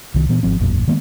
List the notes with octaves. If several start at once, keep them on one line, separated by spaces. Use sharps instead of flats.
C2 D#3
A#2 E3 B3
G#1 F3 C4
E1 B1 F#2 A#2
D#3 G#3 A#3 B3